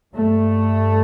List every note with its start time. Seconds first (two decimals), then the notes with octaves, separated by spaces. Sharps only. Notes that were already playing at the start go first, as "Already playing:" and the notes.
0.14 G2 A3